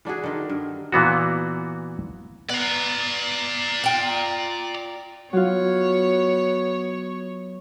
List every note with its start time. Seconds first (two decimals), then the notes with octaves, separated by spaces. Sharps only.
0.05 E3 D4 F#4 G#4
0.23 D3 D#3
0.49 G2
0.92 A#2 E3 B3 F#4
2.49 B3 D5 A#5
3.84 F4 G5
5.33 F#3 B3 F4 C#5